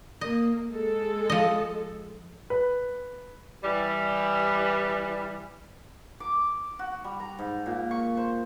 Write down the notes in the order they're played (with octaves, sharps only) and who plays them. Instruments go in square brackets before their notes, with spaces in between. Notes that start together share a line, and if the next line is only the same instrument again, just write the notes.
[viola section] A#3 [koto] D#5
[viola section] G#3 A4
[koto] F3 D#5
[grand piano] B4
[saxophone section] E3 G3
[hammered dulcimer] D6
F#4
G3
A#5
G#2
A#2
C#6
C5